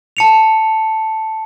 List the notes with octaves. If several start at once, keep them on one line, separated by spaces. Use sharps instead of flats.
A5 C#7 F7